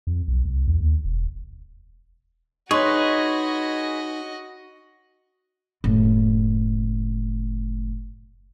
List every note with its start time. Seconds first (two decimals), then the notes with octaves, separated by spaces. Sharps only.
0.07 F2
0.28 B1
0.45 C2
0.67 E2
0.80 D#2
1.05 E1
2.71 D#4 F#4 G#4 B4 C#5 D#5 C6 C#6
5.84 F#1 A2